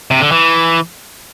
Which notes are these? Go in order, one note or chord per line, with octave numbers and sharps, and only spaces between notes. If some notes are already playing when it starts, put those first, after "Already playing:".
C3
D3
E3